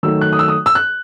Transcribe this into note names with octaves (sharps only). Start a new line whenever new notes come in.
D#3 F#3 A3 E6
F#6
D#6
E6
D#6
E6
F#6